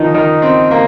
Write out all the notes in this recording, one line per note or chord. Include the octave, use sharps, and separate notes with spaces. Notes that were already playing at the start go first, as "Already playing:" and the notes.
Already playing: D#3 F3 D#4
D#3 D#4
C4
A#3